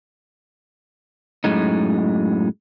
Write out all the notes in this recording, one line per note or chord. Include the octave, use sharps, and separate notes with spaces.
F#2 A2 G#3 D#4